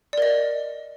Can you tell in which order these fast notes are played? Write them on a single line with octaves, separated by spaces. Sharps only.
D5 A#4 D#5